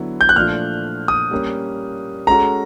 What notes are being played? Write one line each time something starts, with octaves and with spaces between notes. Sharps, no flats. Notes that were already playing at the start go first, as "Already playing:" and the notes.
Already playing: D3 F#3 B3 E4
G6
F#6
A#2 F3 A3 D4 F4 F6
D#6
G3 A#3 C#4
G#3 C#4 F#4 A4 A#5